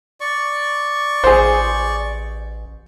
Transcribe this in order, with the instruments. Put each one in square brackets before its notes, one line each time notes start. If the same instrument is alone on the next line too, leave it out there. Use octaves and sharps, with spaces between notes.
[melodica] D5 C#6
[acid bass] A1 [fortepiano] G#4 C5